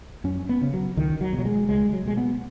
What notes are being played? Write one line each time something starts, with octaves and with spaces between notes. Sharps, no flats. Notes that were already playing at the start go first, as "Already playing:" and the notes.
F#2 C#4
B3
C#3
F#3
C#2 D#3
F#3
B2
F#3
G#3
C#2 G#3
F#3
B2 G#3
B3